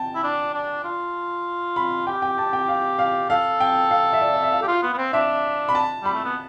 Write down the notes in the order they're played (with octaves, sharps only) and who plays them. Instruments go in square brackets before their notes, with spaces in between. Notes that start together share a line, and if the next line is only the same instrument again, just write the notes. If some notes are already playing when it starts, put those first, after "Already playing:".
Already playing: [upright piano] G5 A5
[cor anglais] E4
D4
D4
F4
[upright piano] B5
[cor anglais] G4 [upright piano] G5
[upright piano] G5
A5
G5
F5
F5
[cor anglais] A4 [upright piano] F5
[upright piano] G5
F5
E5
D5
D5
E5
F5
[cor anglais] G4
F4
B3
B3
C4
[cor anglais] D4 [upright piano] E5
[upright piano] B5
A5
[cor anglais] G3 [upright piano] B5
[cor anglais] A3
B3